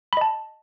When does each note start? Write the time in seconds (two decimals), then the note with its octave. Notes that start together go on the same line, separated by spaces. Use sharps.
0.13 B5
0.17 D#5
0.21 A5